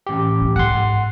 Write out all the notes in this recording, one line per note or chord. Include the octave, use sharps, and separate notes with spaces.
A1 G4
E3
G#2 F#5 C6